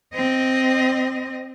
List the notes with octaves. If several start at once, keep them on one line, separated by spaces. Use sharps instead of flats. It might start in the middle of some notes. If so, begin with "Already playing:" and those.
C4 D#5